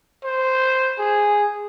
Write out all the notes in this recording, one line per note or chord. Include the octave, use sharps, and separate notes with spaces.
C5
G#4